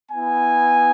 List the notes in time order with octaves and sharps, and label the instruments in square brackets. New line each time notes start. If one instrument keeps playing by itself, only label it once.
[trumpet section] B3 E4 G#5